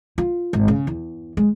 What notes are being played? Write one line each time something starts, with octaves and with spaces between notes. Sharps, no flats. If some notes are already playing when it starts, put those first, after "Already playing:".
F4
G#1
C#3
E2
G#3